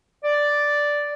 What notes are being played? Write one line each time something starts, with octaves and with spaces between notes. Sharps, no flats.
D5